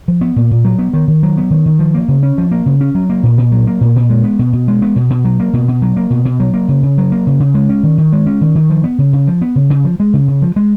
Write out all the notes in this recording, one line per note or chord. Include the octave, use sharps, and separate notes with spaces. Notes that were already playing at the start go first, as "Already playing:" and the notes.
F3
B3
A#2
A#2
F#3
B3
D#3
D#3
F#3
B3
D#3
D#3
F3
A#3
C#3
C#4
F3
A#3
C#3
C#4
F#3
A#3
A#2
A#2
F#3
A#3
A#2
A#2
G#3
B3
B2
B2
G#3
B3
B2
B2
F#3
A#3
B2
B2
F#3
A#3
B2
B2
F#3
A#3
C#3
C#3
F#3
A#3
C#3
C#3
G#3
C#4
D#3
D#3
G#3
C#4
D#3
D#3
F3
B3
C#3
C#3
F3
B3
C#3
C#3
F3
G#3
C#3
C#3
F3
G#3